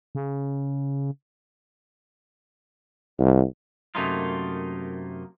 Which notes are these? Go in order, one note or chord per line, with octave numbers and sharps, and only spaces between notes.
C#3
C2
F#2 C3 A3 A#3 D#4 F4